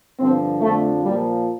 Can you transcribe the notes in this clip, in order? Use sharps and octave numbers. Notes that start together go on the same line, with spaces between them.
G2 D3 F3 C4
F2 D3 F3 A3
A#2 F3 G3